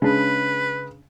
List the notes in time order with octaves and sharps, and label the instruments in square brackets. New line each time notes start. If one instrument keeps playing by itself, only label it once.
[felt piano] C#3 G#3 [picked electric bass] C#4 D4 [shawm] B4